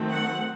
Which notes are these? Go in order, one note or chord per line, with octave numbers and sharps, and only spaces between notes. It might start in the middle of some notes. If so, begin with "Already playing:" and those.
Already playing: D#3 F#3 A3 C4
F#5